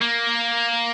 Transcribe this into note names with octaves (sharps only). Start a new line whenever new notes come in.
A#3